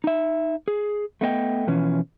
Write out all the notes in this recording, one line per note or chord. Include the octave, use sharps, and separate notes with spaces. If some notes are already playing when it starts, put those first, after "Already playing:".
D#4 E5
G#4
A3 B3 D#5 G5
B2 E3 F3 C#4